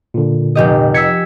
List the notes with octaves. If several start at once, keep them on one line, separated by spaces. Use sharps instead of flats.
A#2 D3
F1 G4 D#5
E6 G#6 B6 C#7